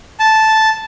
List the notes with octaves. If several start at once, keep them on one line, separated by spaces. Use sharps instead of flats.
A5